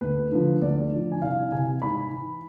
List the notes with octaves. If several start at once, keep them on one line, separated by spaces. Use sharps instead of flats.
D2 B4
D3 F3
D2 D5
D3 F3
G#5
C2 F5
C3 E3 G#5
G#2 B5
E3